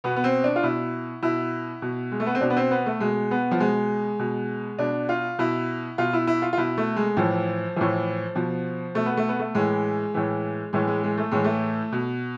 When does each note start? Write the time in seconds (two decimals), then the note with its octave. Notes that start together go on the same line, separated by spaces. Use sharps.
0.04 B2 B3
0.16 B3
0.24 C4
0.44 D4
0.56 F4
0.63 B2 E4
1.23 B2 E4
1.82 B2
2.12 G#3
2.20 A3
2.26 B3
2.35 C4
2.41 B2 D4
2.50 B3
2.56 C4
2.71 B3
2.86 A3
3.00 B2 G#3
3.31 B3
3.51 F3
3.60 B2 G#3
4.19 B2
4.79 B2 D4
5.09 F4
5.39 B2 E4
5.98 B2 F4
6.13 E4
6.27 E4
6.42 F4
6.53 F4
6.58 B2 E4
6.78 A3
6.96 G#3
7.17 A2 E3 F3
7.76 A2 E3 F3
8.35 B2 F3
8.95 B2 A3
9.06 B3
9.17 A3
9.28 B3
9.39 A3
9.55 A2 E3 G#3
10.14 A2 E3
10.73 A2 E3 G#3
10.87 G#3
11.03 G#3
11.18 A3
11.31 A2 E3 G#3
11.44 A3
11.92 B2